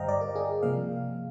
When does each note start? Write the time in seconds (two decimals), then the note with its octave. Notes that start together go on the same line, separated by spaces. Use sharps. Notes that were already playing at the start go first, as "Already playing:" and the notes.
Already playing: G2 D3 G3 C5 D#5 F5 G5 A#5
0.08 D5
0.21 A#4
0.36 G#4
0.63 C3 F3 A#3 F5